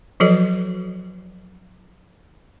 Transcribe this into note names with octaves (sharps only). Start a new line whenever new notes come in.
F3 F#3 F#4 A4 B4 D#5